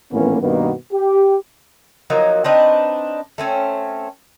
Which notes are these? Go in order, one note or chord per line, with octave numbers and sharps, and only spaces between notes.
G#1 A2 E3 A#3 B3 C#4
G2 B2 D#3 A#3 B3
G4
F3 F#3 A#3 D#4
C4 D4 D#4 B4
A3 C4 C#4